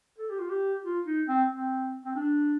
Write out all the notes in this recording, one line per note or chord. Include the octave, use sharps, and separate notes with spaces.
A4
G4
F4
G4
F4
D#4
C4
C4
C4
D4